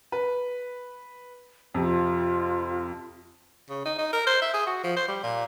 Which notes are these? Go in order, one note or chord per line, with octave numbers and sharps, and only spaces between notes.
B4
F2 C3 F4
C#3
D#4
D#4
A#4
C5
E5
G#4
F#4
F3
C5
G3
A#2